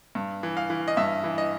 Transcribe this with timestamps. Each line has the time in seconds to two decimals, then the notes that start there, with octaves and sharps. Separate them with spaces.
0.15 G2
0.43 E3
0.57 F5
0.70 E3
0.88 D#5
0.97 G2 E5
1.24 E3
1.38 D#5